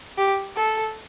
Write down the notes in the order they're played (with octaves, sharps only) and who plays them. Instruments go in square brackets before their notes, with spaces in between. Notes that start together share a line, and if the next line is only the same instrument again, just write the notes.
[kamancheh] G4
A4